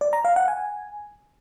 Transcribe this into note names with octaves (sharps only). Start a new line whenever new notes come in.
D5
A#5
F5
F#5
G#5